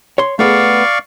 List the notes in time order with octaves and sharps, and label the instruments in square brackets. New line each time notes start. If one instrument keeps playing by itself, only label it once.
[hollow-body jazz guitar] C#5 C6
[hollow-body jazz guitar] A3 B3 G#4 [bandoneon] D5 F5 C#6